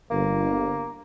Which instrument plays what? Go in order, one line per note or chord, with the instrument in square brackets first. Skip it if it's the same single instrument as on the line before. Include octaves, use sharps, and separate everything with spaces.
[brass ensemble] G1 [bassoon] A#3